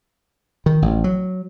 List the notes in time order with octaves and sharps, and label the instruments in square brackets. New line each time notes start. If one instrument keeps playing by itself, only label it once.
[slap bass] D#3
A1
F#3